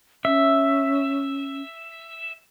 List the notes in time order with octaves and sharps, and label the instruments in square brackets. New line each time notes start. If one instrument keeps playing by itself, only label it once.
[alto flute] C#4 [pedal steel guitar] E5